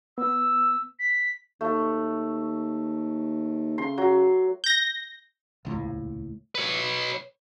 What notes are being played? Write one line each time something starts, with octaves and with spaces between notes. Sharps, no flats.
B3 E6
B6
D#2 A3
C#3 C6
F#3
G6 A#6
D#1 C#2 A2
B4 C#5